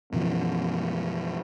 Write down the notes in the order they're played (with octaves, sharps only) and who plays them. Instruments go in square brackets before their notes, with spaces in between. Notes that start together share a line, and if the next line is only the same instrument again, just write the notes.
[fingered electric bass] F#2 B2 E3 F3